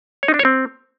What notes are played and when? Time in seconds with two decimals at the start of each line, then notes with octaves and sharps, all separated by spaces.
0.23 C#5
0.28 D#4
0.34 D4
0.39 C#5
0.45 C4